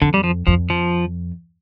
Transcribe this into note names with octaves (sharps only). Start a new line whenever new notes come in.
F2 D3
G3
F3
F2 F3
F3